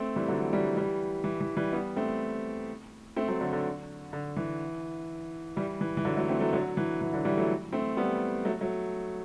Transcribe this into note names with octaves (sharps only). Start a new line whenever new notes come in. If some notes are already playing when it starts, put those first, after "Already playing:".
Already playing: A3 C4
E3 G3
D3 F#3
E3 G3
E3 G3
E3
E3
E3 G3
G3 B3
A3 C4
A3 C4
F#3 A3
D3 F#3
D3
D3
E3
E3 G3
E3
E3
D3 F#3
F#3 A3
A3 C4
F#3 A3
D3 F#3
E3
E3
D3 F#3
E3 G3
F#3 A3
A3 C4
G3 B3
F#3 A3
F#3 A3